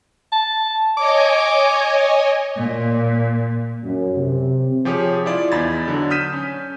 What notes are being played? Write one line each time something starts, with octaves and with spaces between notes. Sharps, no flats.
A5
C#5 D#5 G#5 D6
A#2
F#2
C3
F3 G4 G#4 C#5
E4 F4 D5 E5
E2 D#4 B5 G#6 A6
D3 F#3 D4
D#6 F6 G6 B6 D#7 E7
C#4